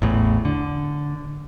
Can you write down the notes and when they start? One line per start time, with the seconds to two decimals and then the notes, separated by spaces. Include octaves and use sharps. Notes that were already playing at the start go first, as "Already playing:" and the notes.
0.02 A1 E2 A2
0.45 D3